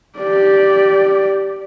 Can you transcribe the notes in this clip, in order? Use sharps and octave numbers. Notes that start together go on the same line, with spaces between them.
G4 D5